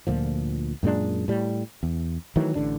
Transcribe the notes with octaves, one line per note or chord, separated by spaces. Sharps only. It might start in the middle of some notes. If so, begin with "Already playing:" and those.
D2 A#2 F3
F#2 A#2 G#3 D4
A2 G3
E2
D#3 E3 F#3 A3
A1 D3 D4